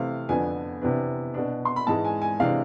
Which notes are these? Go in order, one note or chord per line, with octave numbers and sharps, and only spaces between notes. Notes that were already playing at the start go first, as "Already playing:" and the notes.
Already playing: C3 E3 A3 C4 F5
F2 D3 F3 B3 D4 G#5
C3 E3 B3 D4
B2 B3 D4
C6
B5
G#2 E3 G#3 A5
G#5
G#5
C3 E3 G#3 D4 F5